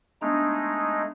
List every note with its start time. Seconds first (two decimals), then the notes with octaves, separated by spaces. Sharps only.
0.22 G#3 A3 B3 D4 D#4